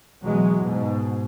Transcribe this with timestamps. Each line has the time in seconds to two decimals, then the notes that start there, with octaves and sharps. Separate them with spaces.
0.21 B2 E3 F#3 G#3
0.60 G#2 B2